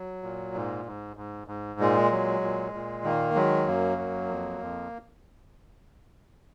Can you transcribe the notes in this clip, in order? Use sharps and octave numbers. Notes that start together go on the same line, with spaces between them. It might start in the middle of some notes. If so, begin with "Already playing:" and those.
Already playing: F#3
A#2
G#2
G#2
G#2
G#2
A#2 G#3
F#3
A#2
A#2
D#3 A#3
F#3 G#3
F#2 A#3
F#3
F2
F2